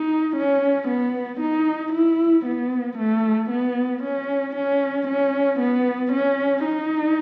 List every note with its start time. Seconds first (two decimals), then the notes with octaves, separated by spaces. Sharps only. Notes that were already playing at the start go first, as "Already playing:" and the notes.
Already playing: D#4
0.36 C#4
0.88 B3
1.40 D#4
1.93 E4
2.46 B3
2.98 A3
3.50 B3
4.03 C#4
4.55 C#4
5.08 C#4
5.60 B3
6.13 C#4
6.65 D#4